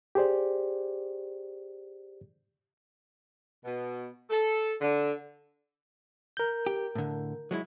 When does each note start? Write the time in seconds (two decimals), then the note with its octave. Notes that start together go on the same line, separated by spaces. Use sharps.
0.15 G4 G#4 C5 D5
3.65 B2
4.30 A4
4.81 D3
6.37 A#4 G6
6.66 G4
6.95 A2 D3
7.51 F#3 G#3 E4